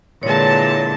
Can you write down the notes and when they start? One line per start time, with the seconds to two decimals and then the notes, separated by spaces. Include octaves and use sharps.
0.23 A#2 D3 E3 G#3 C#5 A5